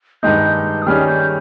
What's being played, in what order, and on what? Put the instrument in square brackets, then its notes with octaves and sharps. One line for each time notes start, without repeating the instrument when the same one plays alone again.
[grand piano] G2 D#3 G#3 D#4 [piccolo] G6
[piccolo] D#6
[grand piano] D#3 G3 C#4 G#4 [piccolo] F6
[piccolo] G6